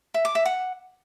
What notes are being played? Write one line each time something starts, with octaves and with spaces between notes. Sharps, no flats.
E5
D6
E5
F#5